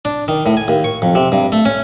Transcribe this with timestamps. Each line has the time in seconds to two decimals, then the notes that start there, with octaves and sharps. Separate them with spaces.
0.05 D4
0.28 D#3
0.46 A2
0.57 G#5
0.68 D#2
0.84 C#6
1.02 F2
1.15 C3
1.32 G2
1.52 A3
1.65 C#4